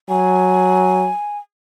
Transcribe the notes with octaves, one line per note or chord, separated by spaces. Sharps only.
F#3 G#5